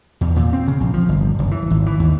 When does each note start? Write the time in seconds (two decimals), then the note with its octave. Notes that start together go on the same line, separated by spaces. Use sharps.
0.21 E2
0.36 A#2
0.53 C4
0.68 C#3
0.81 A#1
0.94 F3
1.09 G1
1.39 F#1
1.51 E3
1.71 G#1
1.86 E3
1.99 D#2